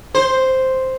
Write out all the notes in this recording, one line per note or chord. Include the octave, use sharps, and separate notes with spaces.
C5